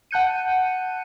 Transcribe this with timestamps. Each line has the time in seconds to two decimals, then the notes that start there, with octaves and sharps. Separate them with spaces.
0.11 F#5 A5 F#6 G6 C#7 D#7